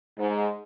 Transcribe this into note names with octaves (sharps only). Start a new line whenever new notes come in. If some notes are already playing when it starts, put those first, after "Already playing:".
G#2